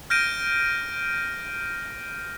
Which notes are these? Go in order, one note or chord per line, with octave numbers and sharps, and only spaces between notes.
F6 G6 A#6 D7 D#7